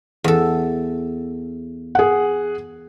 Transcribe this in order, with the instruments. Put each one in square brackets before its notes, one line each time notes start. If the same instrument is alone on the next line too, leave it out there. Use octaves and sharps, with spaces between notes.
[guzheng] E2 A4
[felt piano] G#4 F#5